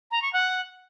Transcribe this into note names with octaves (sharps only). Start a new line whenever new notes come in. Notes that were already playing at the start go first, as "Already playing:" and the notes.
A#5
C#6
F#5